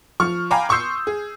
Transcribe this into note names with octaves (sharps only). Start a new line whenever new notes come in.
F3 C#6 F6
F5 G5 G#5 A#5 B5 D6
C6 C#6 D#6 E6 G6 C7
G#4